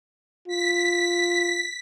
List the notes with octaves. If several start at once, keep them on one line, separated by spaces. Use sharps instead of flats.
F4 B6